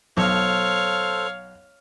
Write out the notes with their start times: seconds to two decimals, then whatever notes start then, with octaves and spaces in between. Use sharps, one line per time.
0.17 B1 A4 C5 C#5 F5